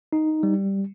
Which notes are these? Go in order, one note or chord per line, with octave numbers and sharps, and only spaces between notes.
D#4
G3